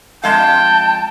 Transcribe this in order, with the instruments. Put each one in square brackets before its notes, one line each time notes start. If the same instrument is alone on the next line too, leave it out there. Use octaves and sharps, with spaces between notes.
[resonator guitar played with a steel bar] F2 G#3 F5 [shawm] G5 [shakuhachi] A5